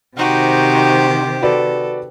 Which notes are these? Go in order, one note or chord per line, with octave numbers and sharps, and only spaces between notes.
C3 D#3 D#4 F#4 G4 C5
F#4 A4 B4 D5